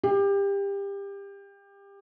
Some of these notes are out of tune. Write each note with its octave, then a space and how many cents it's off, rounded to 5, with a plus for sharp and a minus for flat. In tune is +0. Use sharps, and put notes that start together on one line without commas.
G4 +25